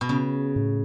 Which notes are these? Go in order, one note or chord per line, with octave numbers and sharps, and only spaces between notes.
B2
C#3 B3
A2